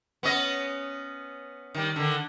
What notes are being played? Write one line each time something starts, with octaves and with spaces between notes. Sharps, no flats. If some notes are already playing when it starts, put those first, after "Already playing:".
B3 C#4 D#5
D#3 G3
D3 D#3